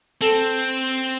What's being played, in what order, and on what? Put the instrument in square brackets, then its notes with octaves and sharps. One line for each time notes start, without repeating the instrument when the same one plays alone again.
[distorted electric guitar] C4 [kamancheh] A4